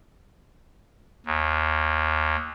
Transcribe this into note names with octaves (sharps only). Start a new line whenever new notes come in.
D#2